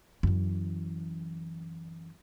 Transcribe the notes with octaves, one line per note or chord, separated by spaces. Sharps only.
F#2 E3